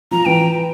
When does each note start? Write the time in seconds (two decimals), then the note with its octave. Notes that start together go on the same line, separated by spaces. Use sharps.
0.11 F3 A#5
0.25 E3 G5